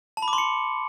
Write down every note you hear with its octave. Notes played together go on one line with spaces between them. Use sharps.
A5
B5
D6
C6
C#7